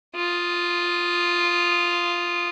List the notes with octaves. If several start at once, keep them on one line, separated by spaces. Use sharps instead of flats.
F4 D#6